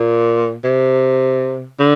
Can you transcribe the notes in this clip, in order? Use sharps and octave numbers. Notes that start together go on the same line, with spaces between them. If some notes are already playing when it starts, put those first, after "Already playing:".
Already playing: A#2
C3
D3